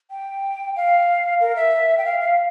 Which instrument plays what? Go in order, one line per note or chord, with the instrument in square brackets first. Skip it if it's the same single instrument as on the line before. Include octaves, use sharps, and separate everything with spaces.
[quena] G5
F5
A#4
E5
G5
F5
F5